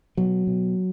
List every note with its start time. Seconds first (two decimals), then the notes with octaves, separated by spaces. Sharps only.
0.17 B2 F#3
0.47 B2